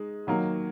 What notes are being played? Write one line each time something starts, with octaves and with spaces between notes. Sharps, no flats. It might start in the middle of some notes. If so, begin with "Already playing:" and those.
Already playing: G#3 D#4
D#3 F#3 A#3